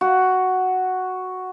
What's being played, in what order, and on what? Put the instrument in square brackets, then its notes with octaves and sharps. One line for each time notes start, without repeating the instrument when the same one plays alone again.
[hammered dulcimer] F#4